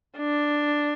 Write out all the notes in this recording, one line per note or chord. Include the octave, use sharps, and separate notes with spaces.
D4